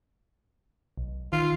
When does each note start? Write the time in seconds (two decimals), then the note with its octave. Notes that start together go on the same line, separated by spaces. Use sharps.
0.98 B1
1.33 D#3 F4